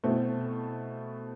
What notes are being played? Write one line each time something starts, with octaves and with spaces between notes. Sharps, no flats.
B2 A3 C4 E4